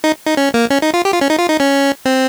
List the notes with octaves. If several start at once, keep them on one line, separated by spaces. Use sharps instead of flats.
D#4
D#4
C#4
A#3
C#4
D#4
F4
G4
F4
C#4
D#4
F4
D#4
C#4
C4